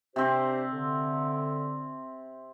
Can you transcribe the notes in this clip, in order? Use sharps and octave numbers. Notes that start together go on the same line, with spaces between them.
C3 C4 D4 G4 C5
D3